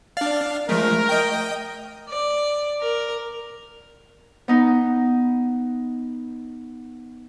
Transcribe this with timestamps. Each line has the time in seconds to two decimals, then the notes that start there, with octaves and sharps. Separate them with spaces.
0.17 D4 D5 F5
0.69 F3 G#3 A3 A#4
1.09 D#5 G5
2.08 D5
2.81 A#4
4.48 B3 D#4